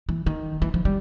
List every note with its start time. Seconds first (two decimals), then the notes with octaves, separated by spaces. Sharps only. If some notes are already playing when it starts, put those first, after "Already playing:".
0.09 E3
0.26 D#3
0.62 E3
0.74 F3
0.85 G3